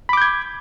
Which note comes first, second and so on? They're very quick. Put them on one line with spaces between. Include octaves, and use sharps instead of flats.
B5 D6 G6 G#6